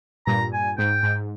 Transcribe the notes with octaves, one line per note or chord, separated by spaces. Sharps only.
G2 A#2 A#5
G#5
G#2 G5
G#2